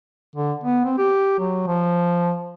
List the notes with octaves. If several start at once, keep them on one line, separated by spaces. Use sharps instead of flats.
D3
B3
C4
G4
F#3
F3